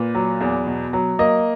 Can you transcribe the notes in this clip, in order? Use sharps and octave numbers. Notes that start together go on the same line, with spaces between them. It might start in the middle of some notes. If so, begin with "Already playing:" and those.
Already playing: A#2 B4
F#3
E2
B2
F#3
A#3 D#5